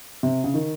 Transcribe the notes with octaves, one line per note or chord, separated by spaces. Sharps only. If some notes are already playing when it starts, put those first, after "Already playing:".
C3
C#3
D#3